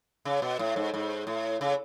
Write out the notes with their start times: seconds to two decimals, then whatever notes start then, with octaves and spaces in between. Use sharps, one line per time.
0.25 C#3
0.42 B2
0.59 A2
0.76 G#2
0.94 G#2
1.27 A2
1.61 C#3